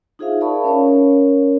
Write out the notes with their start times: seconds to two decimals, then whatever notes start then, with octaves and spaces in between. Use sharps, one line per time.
0.19 D#4 F4 G#4 C5 E5 F5
0.41 A#4 D5 F5 A5 B5 C#6
0.64 C#4 A#4 C#5